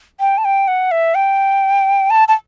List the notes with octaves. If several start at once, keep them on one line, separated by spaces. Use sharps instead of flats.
G5
A5
G5
F#5
E5
G5
A5
A5